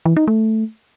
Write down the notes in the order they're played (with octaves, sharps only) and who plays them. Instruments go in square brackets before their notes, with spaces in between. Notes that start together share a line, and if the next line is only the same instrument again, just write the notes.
[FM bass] E3
D#4
A3